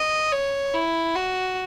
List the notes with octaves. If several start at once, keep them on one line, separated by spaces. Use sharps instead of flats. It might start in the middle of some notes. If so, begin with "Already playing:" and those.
Already playing: D#5
C#5
E4
F#4